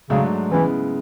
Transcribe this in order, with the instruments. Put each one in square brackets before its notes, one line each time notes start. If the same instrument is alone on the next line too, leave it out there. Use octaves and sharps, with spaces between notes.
[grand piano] G#2 F#3 A3 D4 [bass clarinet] C#3
[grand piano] C#3 G#3 B3 E4 [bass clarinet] E3